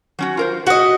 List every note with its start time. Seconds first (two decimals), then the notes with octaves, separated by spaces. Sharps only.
0.19 F#3 C#4 F#4
0.37 F4 A#4 C5
0.66 F#4 D#5 E5 F#5